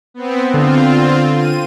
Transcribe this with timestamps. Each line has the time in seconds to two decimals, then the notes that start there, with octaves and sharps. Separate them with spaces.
0.14 B3 C4
0.54 D3 C4 F4
1.36 D#7